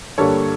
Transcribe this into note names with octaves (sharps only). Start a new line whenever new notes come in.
G2 D3 G3 A#3 A4 C#5